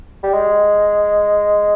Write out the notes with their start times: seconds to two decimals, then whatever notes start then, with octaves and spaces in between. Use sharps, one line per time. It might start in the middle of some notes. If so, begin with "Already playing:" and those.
0.23 G3
0.33 G#3